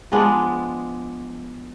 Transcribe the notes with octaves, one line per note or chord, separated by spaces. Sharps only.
F3 G#3 B3 D4